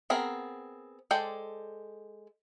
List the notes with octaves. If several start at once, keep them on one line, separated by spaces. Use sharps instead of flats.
B3 C4 G#4 A#4
G#3 A4 C5 D5 G5